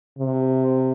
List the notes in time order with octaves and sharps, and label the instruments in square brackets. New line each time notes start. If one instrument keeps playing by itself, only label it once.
[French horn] C3